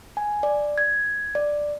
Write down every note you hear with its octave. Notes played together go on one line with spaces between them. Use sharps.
G#5
D5
G#6
D5